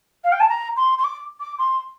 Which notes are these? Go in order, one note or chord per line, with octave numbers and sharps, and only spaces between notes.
F5
G5
A5
A#5
C6
C6
D6
D6
C6